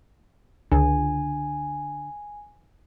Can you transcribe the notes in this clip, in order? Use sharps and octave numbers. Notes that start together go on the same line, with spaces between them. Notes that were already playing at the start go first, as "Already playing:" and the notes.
C#2 D3 D4 G#5